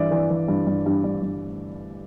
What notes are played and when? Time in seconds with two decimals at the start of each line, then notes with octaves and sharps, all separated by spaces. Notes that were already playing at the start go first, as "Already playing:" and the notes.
Already playing: G2 E3 D5 E5
0.11 E3 D5
0.30 E3
0.48 G2
0.67 G2
0.86 G2
1.04 G2
1.23 G2